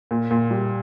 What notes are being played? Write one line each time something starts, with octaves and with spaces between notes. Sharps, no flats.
A#2
A#2
G3